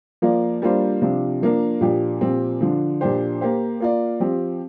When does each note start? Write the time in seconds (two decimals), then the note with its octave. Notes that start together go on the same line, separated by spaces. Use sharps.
0.22 F3 A#3 F4 D5
0.62 G3 A#3 D4 F4 C5
1.01 C3 F3 D4 F4
1.42 F3 A#3 D4 A#4
1.81 A#2 F3 D4 G4 D5
2.21 A#2 F3 C4 G4
2.61 D3 F3 D4
3.01 A#2 F3 D4 G4 C5
3.41 A#3 G4 C5
3.80 A#3 F4 D5
4.20 F3 C4 G4